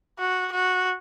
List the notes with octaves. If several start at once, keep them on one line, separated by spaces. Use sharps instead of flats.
F#4
F#4